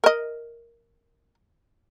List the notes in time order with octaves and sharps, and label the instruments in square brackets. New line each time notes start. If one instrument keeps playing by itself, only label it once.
[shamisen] A#4 D#5